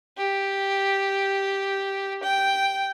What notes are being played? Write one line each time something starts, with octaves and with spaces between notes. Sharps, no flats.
G4
G5